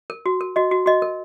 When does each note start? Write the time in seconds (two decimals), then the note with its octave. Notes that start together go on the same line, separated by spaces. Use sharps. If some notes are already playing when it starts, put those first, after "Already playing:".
0.10 A#4
0.26 F#4
0.41 A#4
0.56 F#4 D#5
0.71 F#4
0.86 F#4 D#5
1.02 A#4